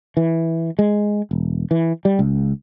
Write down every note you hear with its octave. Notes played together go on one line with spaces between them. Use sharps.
E3
G#3
E1
E3
G3
C#2